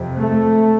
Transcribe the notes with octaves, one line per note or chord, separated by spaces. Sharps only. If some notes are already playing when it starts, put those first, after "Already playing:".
Already playing: F2 C3
A3